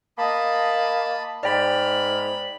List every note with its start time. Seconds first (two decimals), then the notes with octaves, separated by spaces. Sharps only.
0.18 A#3 D#5 A5 B5
1.43 G#2 D5 G5 B5 F6